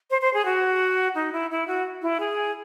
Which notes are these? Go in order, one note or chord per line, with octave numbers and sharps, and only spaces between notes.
C5
C5
G#4
F#4
D#4
E4
E4
F#4
E4
G#4